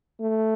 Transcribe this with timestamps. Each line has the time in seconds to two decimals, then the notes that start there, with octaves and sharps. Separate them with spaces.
0.21 A3